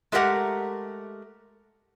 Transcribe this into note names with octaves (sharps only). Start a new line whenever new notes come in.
G#3 A3 G4 A#4 F#5